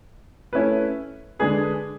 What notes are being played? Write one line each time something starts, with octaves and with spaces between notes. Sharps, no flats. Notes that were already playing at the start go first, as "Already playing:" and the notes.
A3 C#4 E4 B4
D3 G#3 D4 G#4 B4